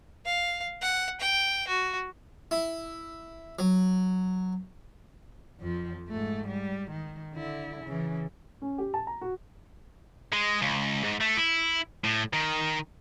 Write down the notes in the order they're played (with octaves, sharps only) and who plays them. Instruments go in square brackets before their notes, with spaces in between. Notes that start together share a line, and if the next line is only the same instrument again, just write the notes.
[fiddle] F5
F#5
G5
F#4
[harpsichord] E4
F#3
[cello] F2 F3
G#2 A3
G3
D#3
D3 E4
C#3 E3
[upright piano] C#4
G4
A5
A#5
F#4
[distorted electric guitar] G#3
C#2
G#2
A3
E4
A2
D#3